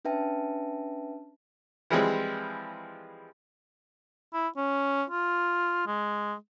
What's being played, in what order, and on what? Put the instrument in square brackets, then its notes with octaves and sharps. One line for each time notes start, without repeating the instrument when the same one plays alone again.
[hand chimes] C#4 D4 B4 E5 G5 A5
[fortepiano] E3 F3 G3 G#3 C4
[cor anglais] E4
C#4
F4
G#3